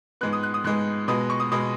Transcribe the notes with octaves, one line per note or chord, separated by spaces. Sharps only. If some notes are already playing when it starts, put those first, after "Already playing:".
G#2 G#3 B3 F#6
D#6
F#6
D#6
G#2 G#3 B3 F#6
B2 G#3 B3 D#6
C#6
D#6
B2 G#3 B3 D#6